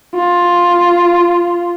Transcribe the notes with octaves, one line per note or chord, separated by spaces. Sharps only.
F4